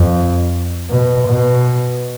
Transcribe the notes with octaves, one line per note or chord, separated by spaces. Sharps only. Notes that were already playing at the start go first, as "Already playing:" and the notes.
Already playing: F2
B2
B2